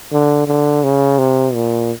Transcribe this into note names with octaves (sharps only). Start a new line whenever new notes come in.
D3
D3
C#3
C3
A#2